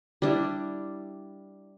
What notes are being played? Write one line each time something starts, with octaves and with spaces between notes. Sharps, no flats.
G3 D4 E4